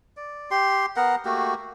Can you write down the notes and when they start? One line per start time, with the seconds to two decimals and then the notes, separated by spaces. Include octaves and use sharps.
0.17 D5
0.51 G4 C6
0.96 B3 A#4 F#5
1.25 A3 A#3 F#4 G4